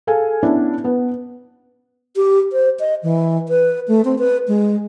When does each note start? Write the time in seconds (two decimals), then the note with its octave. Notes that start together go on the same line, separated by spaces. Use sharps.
0.07 G#4 A4 F5 G#5
0.43 B3 C#4 D4 E4
0.84 B3 B4
2.16 G4
2.52 C5
2.80 D#5
3.03 E3
3.49 B4
3.88 A3
4.05 C4
4.19 B4
4.48 G#3